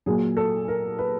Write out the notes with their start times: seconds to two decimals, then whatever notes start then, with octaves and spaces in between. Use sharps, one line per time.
0.06 A#2 F#3 G#4
0.37 A4
0.68 A#4
0.99 B4